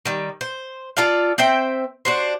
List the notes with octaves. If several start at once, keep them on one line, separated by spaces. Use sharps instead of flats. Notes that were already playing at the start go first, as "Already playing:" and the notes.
D#3 G3
C5
F4 A4 D5 F5
C4 C5 E5 G5
D4 F#4 C5